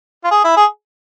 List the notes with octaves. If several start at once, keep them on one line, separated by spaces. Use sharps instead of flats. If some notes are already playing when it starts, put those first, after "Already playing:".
F4
G#4
E4
G#4